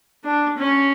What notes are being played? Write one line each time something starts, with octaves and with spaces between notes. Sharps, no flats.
D4
C#4